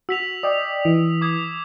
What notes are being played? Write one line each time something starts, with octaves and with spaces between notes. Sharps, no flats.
F#4 E6 B6 F7
D5 D#5 G5 D#6
E3
D6 D#6 G#6